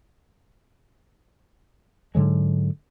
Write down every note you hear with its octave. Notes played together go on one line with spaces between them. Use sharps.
G#2 D3 F#3 G#3